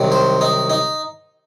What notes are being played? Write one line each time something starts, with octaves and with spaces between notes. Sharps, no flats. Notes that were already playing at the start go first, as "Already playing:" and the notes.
Already playing: C2 C3 D#3 F#3
C5
D#4
D#4